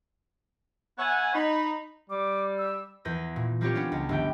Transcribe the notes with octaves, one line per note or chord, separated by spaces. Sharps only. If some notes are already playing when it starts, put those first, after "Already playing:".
B3 C#5 E5 F#5 G#5
D#4 B5
G3 D6
E6
E2 B4 G6 A#6
A#2
G3 A#3 C4 F4 G4 C#5
G3 B3 C#4 D4
C#2
G1 G3 A3 G5